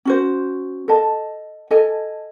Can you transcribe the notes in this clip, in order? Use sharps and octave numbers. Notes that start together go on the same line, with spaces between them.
C#4 F#4 C5
A4 D#5 A5
A4 D#5 G#5